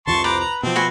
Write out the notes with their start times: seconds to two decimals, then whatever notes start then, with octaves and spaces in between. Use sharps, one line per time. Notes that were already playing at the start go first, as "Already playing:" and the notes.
0.07 C2 F2 F3 A5 C6 C#6
0.24 B4 C5 A#5 D6
0.40 A#5
0.63 B2 F3 C4
0.76 F#4 B4 G#5